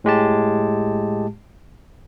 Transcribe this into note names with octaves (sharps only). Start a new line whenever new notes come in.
A2 G#3 G4 A5